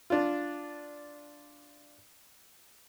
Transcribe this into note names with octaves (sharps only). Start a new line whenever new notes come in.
D4 F4